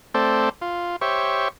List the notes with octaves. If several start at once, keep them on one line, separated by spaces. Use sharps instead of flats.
A3 C4 A4 C5 D5
F4
G4 C5 C#5 E5 C#6